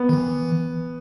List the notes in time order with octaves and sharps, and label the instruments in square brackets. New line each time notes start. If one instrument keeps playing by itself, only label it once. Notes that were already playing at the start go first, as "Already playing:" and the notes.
Already playing: [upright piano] B3
[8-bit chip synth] D#3
E3